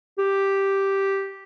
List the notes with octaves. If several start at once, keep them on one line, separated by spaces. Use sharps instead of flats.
G4